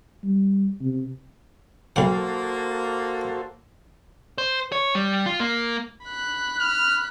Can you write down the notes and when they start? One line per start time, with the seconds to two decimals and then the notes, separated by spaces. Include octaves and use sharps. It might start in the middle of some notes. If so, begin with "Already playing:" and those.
0.24 G3
0.81 C3
1.96 B1 A#3 F#4 A4 C5 F#5
4.38 C5
4.72 C#5
4.95 G3
5.26 F4
5.40 A#3
6.05 B5 F#6
6.59 F6